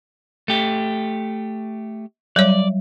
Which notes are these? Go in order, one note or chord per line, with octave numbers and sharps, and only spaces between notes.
A3 G4
F#3 G3 C#5 D5